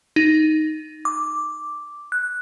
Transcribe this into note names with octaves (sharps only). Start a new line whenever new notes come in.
D#4
D6
F#6